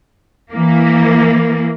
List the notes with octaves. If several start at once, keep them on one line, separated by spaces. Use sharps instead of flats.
E3 A#3